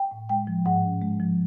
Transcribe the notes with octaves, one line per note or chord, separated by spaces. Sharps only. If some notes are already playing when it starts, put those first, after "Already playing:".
Already playing: G5
A2
G#3 G5
F3
G#2 F#5
C#4
G#3
F3